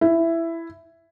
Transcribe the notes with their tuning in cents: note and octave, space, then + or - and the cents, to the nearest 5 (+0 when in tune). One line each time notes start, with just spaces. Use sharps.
E4 +10